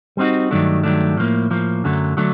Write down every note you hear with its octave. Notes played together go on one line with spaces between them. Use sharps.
G3 C4 D#4 F#4
G2 D#3 F#3 A3 D4
G2 D#3 F#3 A3 D4
A2 F3 A#3
A2 F3 A#3
F#2 D3 F#3 A3
D3 F#3 A3